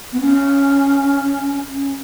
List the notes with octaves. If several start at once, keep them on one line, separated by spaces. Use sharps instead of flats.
B3
C#4
C#4